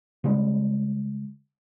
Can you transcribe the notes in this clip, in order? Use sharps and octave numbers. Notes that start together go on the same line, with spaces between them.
C#3 G3 G#3